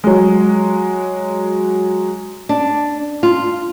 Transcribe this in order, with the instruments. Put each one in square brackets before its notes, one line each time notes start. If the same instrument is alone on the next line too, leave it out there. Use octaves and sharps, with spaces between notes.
[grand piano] F#3 G#3
[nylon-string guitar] D4
F4